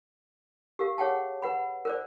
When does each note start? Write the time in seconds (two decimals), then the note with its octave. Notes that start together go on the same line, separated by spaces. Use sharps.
0.79 G4 A#4 F5
0.98 G#4 C#5 F#5 G5 A5
1.42 B4 F#5 B5
1.85 A#4 C5 D5